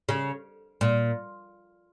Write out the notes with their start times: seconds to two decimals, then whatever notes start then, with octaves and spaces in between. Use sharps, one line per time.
0.09 C#3
0.81 A#2